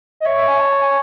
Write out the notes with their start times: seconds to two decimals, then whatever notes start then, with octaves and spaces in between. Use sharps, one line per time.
0.20 D#5
0.25 C#5 E5
0.37 E5
0.48 G#5
0.59 A5
0.70 A5
0.82 G#5